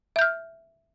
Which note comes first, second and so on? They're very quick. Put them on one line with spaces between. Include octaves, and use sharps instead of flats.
E5 G6 F6